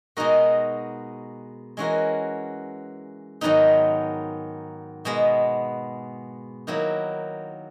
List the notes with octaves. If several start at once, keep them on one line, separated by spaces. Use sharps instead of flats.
B2 G#3 D#4 F#4 A#4
E3 G#3 C#4 F#4 A#4
G#2 D#3 F#3 B3 D#4
B2 G#3 B3
D#3 F#3 A#3 E4 B4